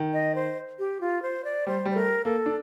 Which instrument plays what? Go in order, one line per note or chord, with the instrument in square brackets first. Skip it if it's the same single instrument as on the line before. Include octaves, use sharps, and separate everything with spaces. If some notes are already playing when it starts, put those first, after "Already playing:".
Already playing: [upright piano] D#3
[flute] D#5
C5
G4
F4
C5
D5
[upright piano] G3 [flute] C5
[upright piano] G3
[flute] C5
[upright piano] A3 [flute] A#4
[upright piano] A#3 [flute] A4
[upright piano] D4